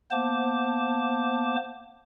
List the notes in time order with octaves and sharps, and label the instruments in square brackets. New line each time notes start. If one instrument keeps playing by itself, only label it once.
[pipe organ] A#3 B3 C5 A5 D6